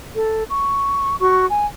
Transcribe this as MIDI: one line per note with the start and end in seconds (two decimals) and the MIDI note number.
0.16 0.43 69
0.49 1.15 85
1.20 1.46 66
1.20 1.46 85
1.49 1.65 80